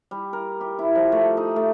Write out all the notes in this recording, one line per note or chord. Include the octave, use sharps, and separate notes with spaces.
G3
A#4
G4
E4
F3
A3
D#4
A3